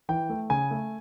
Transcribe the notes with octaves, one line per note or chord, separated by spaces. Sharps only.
E3 G5
A3
C#3 G#5
A3